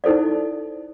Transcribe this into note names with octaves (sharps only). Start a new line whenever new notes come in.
D#4 E4 A4 C5 D5